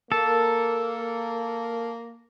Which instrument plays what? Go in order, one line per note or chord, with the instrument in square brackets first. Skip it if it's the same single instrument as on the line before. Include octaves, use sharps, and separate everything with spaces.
[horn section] A#3 [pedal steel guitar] A4